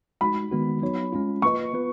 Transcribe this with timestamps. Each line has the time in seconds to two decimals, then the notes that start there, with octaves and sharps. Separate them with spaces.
0.21 G#3 D#4 F#4 B5
0.51 D#3 G#3 B3 F#4
0.82 F#3 B3 D#4 F#4 C#5
1.12 G#3 C#4 F4
1.42 A#3 F4 B4 D#5 C#6
1.74 B3 F4 B4